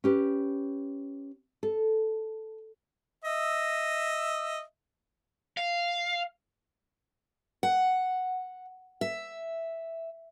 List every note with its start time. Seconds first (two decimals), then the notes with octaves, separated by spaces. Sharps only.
0.04 C#4 G4 B4
1.63 A4
3.24 D#5 E5
5.57 F5
7.63 F#5
9.01 E5